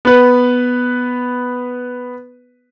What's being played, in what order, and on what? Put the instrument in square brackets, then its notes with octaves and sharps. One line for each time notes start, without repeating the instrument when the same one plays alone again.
[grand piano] B3 B4